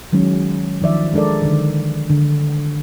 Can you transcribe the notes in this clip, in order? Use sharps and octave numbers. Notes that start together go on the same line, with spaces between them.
D#3 F#3 G#3 C#4
D#3 F3 D5 E5
G#3 D4 A4 A#4 D5
D3 D#3
D3